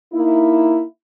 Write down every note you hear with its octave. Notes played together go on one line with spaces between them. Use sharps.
A#3 D#4 E4